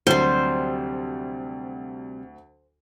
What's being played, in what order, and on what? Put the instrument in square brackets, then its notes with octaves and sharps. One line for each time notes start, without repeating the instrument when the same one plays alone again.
[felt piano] D2 F#3 [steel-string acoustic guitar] C3 G3 [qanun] C5